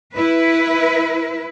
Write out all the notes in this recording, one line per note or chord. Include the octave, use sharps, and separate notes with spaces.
E4 B4